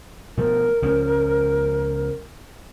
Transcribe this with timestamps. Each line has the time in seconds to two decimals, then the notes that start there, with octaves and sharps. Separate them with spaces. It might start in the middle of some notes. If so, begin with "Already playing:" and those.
0.37 B2 F3 A3 A#4
0.82 C#2 F3 C#4